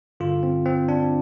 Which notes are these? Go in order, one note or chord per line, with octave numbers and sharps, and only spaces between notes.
G2 D3 F4
C4
C4
D4